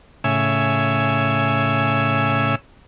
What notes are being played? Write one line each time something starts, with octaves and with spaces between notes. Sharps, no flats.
A2 C#3 C#5 E5 G#5 E6